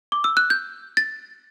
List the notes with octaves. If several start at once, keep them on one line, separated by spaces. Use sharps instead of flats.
D6
E6
F#6
G6
A6